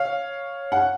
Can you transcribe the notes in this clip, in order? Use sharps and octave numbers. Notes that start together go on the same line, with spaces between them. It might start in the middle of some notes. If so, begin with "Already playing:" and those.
Already playing: C#5 F5
F#5